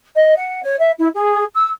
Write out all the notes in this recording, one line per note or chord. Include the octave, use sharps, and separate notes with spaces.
D#5
F#5
C#5
E5
E4
G#4
E6